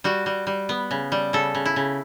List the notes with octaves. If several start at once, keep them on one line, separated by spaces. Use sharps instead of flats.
G3 F#4
G3
G3
B3
C#3
G3
C#3 A4
C#3
E4
C#3